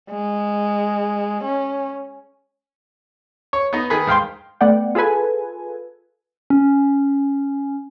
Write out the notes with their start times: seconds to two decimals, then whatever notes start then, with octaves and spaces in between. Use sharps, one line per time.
0.11 G#3
1.44 C#4
3.53 C#5
3.73 B3 D#4
3.90 D#3 G#4 B4
4.07 G#2 F5 G5 C6
4.61 A3 B3 D5 F#5 G5
4.95 F4 G#4 A4 B4 G#5
6.50 C#4